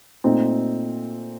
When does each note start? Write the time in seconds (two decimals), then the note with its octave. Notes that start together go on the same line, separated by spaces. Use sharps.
0.24 A#2 A3 C4 D#4